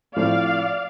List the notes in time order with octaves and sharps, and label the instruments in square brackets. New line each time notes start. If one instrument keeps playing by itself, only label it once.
[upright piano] A2 F3 A3 C4 [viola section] D5 F5